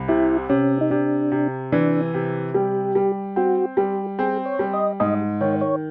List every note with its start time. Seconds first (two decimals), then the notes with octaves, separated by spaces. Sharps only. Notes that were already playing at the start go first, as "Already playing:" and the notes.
Already playing: C2
0.08 C3 E4
0.49 C3 C#4
0.81 D#4
0.90 C3 D4
1.32 C3
1.72 E3 D4
2.14 C3
2.54 G3 G4
2.95 G3
3.36 C4 F#4
3.77 G3 G4
4.19 C4 G#4
4.46 C#5
4.59 G3
4.74 D#5
5.00 G#2 D#5
5.41 D#3 C#5
5.61 C#5